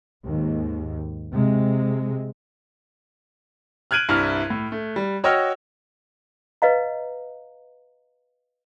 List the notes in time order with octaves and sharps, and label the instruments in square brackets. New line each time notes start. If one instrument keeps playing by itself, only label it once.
[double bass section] D#2 G#2
C3 G#3
[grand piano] F6 F#6 G#6 D7 D#7 F#7
C2 G2 E4 F6
A2
A3
G3
F#4 C#5 D#5 G5 E6 F6
[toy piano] B4 D#5 F5 A#5